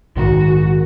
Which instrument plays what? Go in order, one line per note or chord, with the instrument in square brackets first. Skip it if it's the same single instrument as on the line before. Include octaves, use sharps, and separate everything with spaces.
[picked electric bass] A#1 G#2 D#3 [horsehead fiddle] F#4